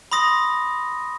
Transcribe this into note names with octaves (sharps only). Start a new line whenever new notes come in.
B5 C6 D#6 A#6